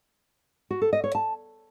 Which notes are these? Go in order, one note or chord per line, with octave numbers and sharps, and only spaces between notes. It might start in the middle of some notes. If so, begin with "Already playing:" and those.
F#4
A4
D#5
C#5
A5